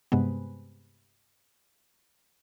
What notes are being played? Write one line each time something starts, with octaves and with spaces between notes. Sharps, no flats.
G2 C3 G#3 B3